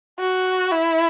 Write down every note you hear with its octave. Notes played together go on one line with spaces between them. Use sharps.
F#4
E4